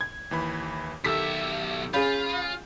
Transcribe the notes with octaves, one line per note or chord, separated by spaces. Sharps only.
G#6
D#2 E3 B5
B1 D#3 G4 A4 E5 E6 B6
C#4 F4 G#4 F5 B5 G6